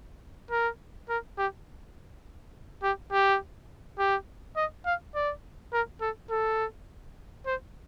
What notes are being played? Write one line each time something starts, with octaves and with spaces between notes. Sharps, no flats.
A#4
A#4
G4
G4
G4
G4
D#5
F5
D5
A#4
A4
A4
C5